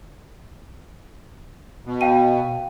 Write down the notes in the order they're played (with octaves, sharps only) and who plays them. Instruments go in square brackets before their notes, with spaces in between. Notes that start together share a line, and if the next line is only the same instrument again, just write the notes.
[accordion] B2
[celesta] F5 G5 D#7